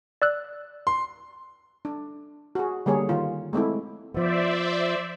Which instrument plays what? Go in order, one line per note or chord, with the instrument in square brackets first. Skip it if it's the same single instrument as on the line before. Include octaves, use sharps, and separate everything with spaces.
[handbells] D5 E6 F#6
[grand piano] C6
[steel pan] D4
F#4 G#4
D3 G3 A#3 G#4 C#5
D#3 F4
G#3 A3 C4 E4
[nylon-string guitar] F3 B3 [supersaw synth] C5 D5 E5